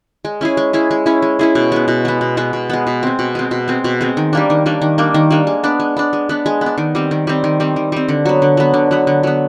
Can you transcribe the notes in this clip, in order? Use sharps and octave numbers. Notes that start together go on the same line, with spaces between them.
G#3
C#4 E4 G#4
G#3
C#4 E4 G#4
G#3
C#4 E4 G#4
G#3
C#4 E4 G#4
B2
G#3 B3
B2
G#3 B3
B2
G#3 B3
B2
G#3 B3
B2
G#3 C4
B2
G#3 C4
B2
G#3 C4
B2
G#3 C4
D#3
G3 A#3 D4
D#3
G3 A#3 D4
D#3
G3 A#3 D4
D#3
G3 A#3 D4
G#3
B3 D4
G#3
B3 D4
G#3
B3 D4
G#3
B3
D4
D#3
G3 C4
D#3
G3 C4
D#3
G3 C4
D#3
G3 C4
D3
F#3 B3
D3
F#3 B3
D3
F#3 B3
D3
F#3 B3